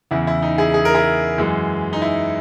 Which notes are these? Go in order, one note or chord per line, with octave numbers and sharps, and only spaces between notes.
E2 C#3 E3 E4
E4
D#4
E4 G#4
G#4
A#4
E4 G#4
F#2 E3 G#3
D#4
E4